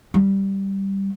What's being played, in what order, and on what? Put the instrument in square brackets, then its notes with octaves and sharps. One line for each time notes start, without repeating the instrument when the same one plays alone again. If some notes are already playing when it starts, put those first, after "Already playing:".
[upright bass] G3